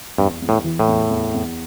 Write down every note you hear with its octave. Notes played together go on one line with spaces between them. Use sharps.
E2 G2
E2
A2
E3
A2
E2
E2
E2